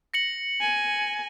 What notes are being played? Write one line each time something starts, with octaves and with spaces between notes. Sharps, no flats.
A#6 C#7 F#7
G#5